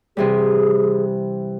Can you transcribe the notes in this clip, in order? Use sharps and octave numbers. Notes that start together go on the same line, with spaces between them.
C3 E3 G3 G#4